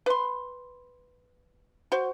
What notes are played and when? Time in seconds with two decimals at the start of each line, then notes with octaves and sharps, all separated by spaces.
0.06 B4 C6
1.92 F#4 C5